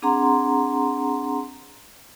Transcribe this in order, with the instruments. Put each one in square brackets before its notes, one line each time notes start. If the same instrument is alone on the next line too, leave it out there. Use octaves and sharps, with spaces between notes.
[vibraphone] C4 D4 G#4 F#5 A#5 C6